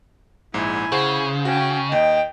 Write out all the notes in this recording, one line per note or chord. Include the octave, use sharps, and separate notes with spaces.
A#1 G#2 E4 G#5
C#3 G#4 C5 F#5
C#4 F#4 G5
D#2 D#5 G5